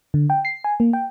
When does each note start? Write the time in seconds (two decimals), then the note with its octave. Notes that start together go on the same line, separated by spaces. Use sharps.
0.14 D3
0.30 G5
0.45 C7
0.64 G#5
0.80 A#3
0.93 G5